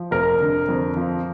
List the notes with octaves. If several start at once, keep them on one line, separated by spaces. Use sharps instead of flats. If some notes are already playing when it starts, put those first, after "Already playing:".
Already playing: F3
F1 A#4
D3
F2
F3